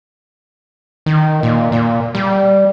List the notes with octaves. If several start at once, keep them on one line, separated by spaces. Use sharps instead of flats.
D#3
A#2
A#2
G3